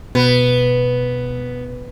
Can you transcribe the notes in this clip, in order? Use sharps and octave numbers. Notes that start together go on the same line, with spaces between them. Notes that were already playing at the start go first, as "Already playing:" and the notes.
B2 B3